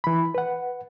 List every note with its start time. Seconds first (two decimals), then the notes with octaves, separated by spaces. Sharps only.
0.04 E3 B5
0.35 B4 F#5